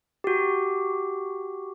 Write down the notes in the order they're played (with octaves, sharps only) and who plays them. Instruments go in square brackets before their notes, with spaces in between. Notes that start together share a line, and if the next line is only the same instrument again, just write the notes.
[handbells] F#4 G4